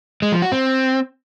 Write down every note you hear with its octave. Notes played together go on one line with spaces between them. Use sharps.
G#3
F3
F#4
C4